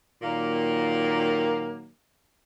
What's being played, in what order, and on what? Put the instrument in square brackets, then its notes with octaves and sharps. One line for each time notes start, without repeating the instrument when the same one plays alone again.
[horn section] A#2 D#3 F#3 A#3